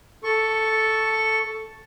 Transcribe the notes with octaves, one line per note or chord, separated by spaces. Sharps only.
A4 C#6